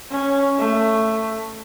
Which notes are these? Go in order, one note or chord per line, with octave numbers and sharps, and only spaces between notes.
C#4
A3